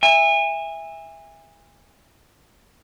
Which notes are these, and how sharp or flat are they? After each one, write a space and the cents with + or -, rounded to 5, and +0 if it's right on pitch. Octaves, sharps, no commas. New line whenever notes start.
E5 +0 G#5 -30